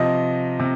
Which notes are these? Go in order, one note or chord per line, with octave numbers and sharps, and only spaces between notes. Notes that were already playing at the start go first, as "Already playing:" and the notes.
Already playing: C3 F3 D#5
C3